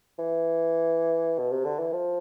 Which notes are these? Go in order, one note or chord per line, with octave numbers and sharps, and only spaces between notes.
E3
B2
C3
D3
E3
F3